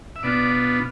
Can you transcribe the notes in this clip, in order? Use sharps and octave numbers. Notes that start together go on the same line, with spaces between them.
E5
B2 B3 D4 F4 D5